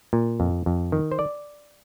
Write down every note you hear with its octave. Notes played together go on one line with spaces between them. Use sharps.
A#2
F2
F2
D#3
C5
D5